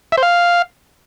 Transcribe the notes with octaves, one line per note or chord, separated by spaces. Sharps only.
E5
C5
F5